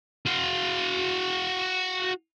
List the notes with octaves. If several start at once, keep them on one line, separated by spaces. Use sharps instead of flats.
F#4 F5